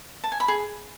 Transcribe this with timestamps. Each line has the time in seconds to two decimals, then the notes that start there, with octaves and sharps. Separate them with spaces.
0.24 A5
0.32 G#5
0.40 B5
0.48 G#4